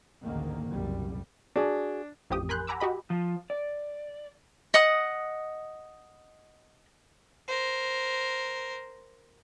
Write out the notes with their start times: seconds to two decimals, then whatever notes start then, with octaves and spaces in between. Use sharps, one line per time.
0.24 A1 D2 G#2 D3 D#3 A#3
0.68 F#1 C2 F#2 A#2 G3
1.56 D4 F#4 G#4
2.30 A1 F2 G4 D#6
2.49 A#4 G#5 B5 C6 F#6 G6
2.67 F#5 G#5 A#5 B5 D6 E6
2.80 F#4 G4 D#5 B5
3.10 F3
3.50 D5
4.74 D#5 F#5 D#6
7.48 A#4 C5